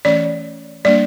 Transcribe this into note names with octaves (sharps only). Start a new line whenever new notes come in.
E3 A3 C#4 D5
G3 A#3 D4 D5